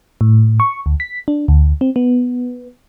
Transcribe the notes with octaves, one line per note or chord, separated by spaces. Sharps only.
A2
C#6
D2
B6
D4
D2
C4
B3